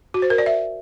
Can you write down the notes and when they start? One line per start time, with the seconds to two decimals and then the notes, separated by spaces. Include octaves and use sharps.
0.14 F#4
0.22 C5
0.30 A#4
0.38 D5
0.46 E5